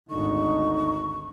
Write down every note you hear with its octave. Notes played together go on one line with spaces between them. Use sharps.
G#1 D2 D3 D#4 C#6